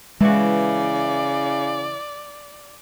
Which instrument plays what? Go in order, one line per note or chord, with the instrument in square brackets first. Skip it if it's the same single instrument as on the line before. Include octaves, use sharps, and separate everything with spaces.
[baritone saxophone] C#3 [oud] E3 F#4 [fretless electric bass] G#3 [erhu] D5